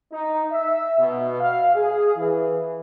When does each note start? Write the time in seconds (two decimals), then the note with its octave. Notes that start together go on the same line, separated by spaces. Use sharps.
0.12 D#4
0.51 E5
0.98 B2
1.41 F5
1.75 G#4
2.16 E3